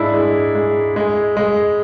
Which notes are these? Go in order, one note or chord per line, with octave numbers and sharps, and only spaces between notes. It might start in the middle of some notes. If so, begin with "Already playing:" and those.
Already playing: G#2 G#3 D4 E4
G#3
G#3
G#3
G#3